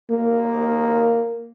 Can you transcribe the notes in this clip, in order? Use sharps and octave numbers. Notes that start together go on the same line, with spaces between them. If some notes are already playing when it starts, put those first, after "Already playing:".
A#3